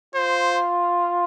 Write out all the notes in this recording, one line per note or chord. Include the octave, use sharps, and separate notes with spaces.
F4 C5